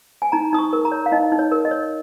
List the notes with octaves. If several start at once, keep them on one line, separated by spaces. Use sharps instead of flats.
G#5
D#4 A#5
D#4 D#6
C#6
A#4
A#5
C#5
F5
D#4 D#5
D#4
C#5
A#4
D#5
C#5